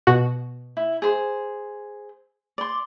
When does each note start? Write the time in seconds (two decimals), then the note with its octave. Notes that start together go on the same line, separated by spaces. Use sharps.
0.07 B2 F#4
0.77 E4
1.02 G#4 C5
2.58 D5 C6